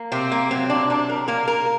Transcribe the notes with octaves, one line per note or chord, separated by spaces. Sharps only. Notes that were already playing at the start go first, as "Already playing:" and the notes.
Already playing: A#3
C3 C4
A#3
F#3 C4
D4
C3 D4
A#4
A#3 A#4
A#4